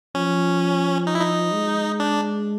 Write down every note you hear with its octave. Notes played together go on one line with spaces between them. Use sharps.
F3 C#4
D#4
E4
D#4
G#3
D4